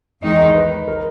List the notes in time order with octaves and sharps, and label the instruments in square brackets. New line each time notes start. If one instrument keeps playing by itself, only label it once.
[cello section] E2 D#3 G#3 D#4 [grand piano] D#5
[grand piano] D#5
B4
A#4